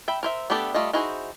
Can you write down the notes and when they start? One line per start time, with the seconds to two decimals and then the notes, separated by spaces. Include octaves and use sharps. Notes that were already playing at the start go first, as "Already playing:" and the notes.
0.08 E5 G5 B5
0.23 A#4 C5 E5
0.50 A3 B3 D4 G4 A4
0.74 G3 A3 F4 D#5
0.93 D#4 E4 F#4 G#4 C5